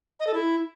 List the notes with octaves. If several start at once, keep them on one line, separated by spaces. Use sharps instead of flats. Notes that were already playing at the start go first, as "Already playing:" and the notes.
D#5
A4
E4